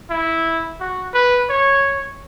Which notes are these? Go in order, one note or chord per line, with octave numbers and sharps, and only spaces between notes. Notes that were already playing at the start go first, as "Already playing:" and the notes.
E4
F#4
B4
C#5